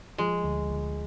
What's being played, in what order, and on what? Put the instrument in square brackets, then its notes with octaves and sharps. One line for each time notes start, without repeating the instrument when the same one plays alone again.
[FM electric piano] F3 [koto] G#3
[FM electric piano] D2
D2